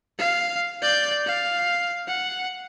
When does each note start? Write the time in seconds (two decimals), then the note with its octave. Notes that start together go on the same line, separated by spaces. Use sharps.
0.19 F5
0.82 D5 G6
1.26 F5
2.08 F#5